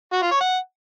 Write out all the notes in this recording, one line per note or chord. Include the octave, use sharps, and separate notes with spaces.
F#4
F4
C#5
F#5